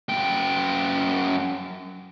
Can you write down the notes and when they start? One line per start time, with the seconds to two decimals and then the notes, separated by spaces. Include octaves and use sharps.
0.09 F#2 G5